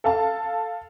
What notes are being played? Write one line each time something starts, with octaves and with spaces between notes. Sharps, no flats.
A4 F5 A5